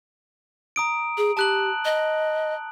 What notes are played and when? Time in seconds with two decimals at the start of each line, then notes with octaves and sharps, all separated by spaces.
0.76 A#5 D#6 D7
1.17 G#4
1.37 G4 A5 F#6 F#7
1.85 D#5